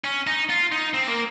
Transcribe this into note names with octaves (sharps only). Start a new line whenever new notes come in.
C#4
D#4
F4
D#4
C4
A#3